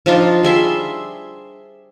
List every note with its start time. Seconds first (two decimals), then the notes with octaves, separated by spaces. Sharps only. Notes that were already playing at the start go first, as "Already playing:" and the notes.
0.06 F3 D4 D#4 F4
0.43 G3 G#4 E5 C6